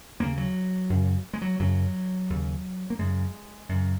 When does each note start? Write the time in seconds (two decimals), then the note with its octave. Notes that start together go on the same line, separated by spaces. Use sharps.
0.20 D#2 C#3 A#3
0.37 F#3
0.90 F#2 C#3
1.33 G#3
1.42 F#3
1.60 F#2 C#3 F#3
2.30 D#2 C#3
2.90 A#3
2.99 F#2 C#3 G#3
3.69 F#2 C#3